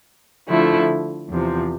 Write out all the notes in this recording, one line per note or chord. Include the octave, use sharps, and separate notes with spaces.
D3 F3 A3 E4
E2 C3 F3